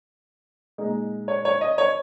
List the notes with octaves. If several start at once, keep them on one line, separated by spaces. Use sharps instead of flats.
A#2 G#3 D#4
C#5
C#5
D#5
C#5